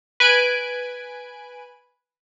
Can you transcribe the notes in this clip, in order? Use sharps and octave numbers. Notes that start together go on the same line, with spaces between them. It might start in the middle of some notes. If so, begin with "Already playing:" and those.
B4 G#5 D7